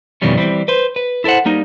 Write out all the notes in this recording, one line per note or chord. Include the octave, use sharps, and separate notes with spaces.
F2 B2 D#3 E3 G3 C#4
E3 G3 C4
B4 C5
B4
E4 A4 A#4 C5 F#5
G3 A#3 D#4